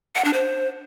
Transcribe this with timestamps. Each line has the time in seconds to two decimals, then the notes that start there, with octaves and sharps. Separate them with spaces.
0.16 F#5
0.25 D4
0.34 C5